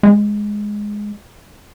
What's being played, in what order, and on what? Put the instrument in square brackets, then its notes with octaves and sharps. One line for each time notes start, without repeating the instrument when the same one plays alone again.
[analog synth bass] G#3